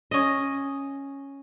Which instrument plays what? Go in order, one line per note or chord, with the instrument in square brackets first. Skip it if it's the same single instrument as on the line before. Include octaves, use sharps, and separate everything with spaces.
[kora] C#4 D#5